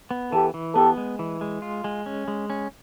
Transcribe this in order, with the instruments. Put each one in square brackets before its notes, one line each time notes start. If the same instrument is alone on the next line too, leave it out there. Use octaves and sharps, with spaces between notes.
[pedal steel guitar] B3
[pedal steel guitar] E3 [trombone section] G4 A4
[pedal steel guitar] E3
[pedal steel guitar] B3 [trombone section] G4 A4
[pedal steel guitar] G#3
E3
G#3
F4
G#3
C#4
G#3
C#4